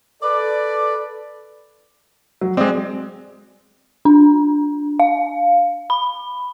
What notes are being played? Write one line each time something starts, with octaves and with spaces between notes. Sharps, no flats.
A4 B4 D5
F#3
G#3 C4 D5 D#6
D4
F5
B5